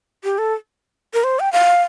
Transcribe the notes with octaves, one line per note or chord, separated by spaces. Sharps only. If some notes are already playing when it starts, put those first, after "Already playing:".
G4
A4
A#4
C5
G5
F5